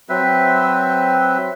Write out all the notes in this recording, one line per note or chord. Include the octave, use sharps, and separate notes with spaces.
F#3 C4 B4 E5